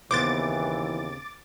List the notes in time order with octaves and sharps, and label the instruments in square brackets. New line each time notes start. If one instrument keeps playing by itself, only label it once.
[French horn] D#2 [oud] C#3 B3 C4 [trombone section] E3 [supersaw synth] D6 A6